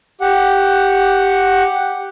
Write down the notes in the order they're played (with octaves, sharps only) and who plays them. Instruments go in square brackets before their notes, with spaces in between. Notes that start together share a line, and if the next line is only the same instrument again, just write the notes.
[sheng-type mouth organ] G4 F#5